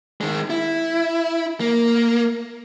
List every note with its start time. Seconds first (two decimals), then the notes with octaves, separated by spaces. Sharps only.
0.21 D#3 G#3
0.50 E4
1.60 A#3